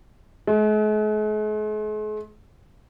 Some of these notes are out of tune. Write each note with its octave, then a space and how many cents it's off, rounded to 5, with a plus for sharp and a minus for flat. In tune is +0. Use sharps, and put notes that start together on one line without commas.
G#3 +45